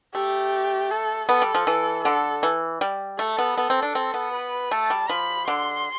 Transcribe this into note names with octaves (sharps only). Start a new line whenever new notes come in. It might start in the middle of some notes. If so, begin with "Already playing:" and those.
A3 G4
A4
B3 A4
G3
F3
E3
D3 A4
E3
G3
A3 A4
B3
B3 A4
C4
D4
C4
B3
B4
A3 A5
G3
F3 B5
D3 C6